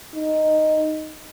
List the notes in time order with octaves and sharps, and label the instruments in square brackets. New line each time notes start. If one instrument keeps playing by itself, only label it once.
[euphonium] D#4